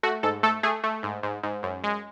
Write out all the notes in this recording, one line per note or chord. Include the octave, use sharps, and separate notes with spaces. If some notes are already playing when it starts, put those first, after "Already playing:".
A3 F#4
G#2 A4
A3 A4
A3 G#4
A3
G#2
G#2
G#2
F#2
G#3